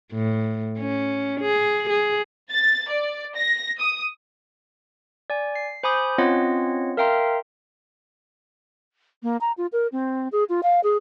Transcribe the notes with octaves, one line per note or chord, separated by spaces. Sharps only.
A2
C#4
G#4
G#4
A6
D5
A#6
D#6
D5 G#5
C7
C5 G#5 B5 D6 D#6 G6
C4 C#4 F4 C#5 D#5 F#5
A#4 E5 F5 G5 A#5 C6
A#3
A#5
F4
A#4
C4
G#4
F4
F5
G#4